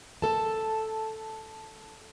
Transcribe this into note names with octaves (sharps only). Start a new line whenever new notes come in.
A4 A5